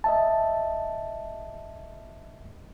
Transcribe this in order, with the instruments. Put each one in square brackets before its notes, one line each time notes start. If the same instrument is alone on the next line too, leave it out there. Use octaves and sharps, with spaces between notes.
[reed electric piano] D#5 E5 A5